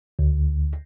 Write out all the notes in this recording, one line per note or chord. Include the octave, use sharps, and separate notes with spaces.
D2